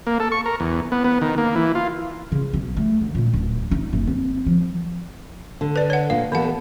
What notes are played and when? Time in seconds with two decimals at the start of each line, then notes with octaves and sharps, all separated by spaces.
0.07 A#3
0.20 A4
0.32 C#6
0.46 A#4
0.60 E2
0.92 B3
1.04 B3
1.22 D#3
1.38 A#3
1.55 E3
1.75 F4
2.32 C#3
2.53 B1
2.77 A3
3.01 D3
3.15 A#2
3.33 D1
3.71 D#4
3.93 F#1
4.07 C4
4.46 F3
5.61 D3
5.76 B4 D5
5.90 C#5 F#5
6.10 A#2 F5
6.32 D#2 E3 B3 A4 F#5